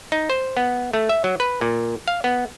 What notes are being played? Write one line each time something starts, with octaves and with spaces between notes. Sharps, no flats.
D#4
C5
B3
A3
E5
F#3
B4
A#2
F5
B3